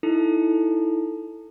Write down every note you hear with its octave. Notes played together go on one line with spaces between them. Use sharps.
D#4 E4 A4